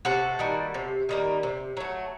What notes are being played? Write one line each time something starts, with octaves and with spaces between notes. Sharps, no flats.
C3 F#4 A4
D#3 G3 A#3
C3
D#3 G3 A#3
C3
F#3 A3